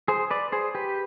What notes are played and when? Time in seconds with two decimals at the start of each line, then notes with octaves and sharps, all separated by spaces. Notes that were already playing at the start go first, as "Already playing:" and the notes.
0.08 G#4 C5
0.31 B4 D5
0.52 G#4 C5
0.75 G4 B4